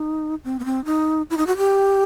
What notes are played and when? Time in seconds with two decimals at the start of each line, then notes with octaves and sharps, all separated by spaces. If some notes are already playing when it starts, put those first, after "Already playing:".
Already playing: D#4
0.44 C4
0.59 B3
0.65 C4
0.85 D#4
1.30 E4
1.37 D#4
1.47 F#4
1.57 G4